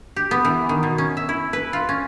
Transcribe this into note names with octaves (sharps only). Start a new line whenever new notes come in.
G4
B3
E3
D#3
B2
C#4
E5
E4
B4
F4
C#4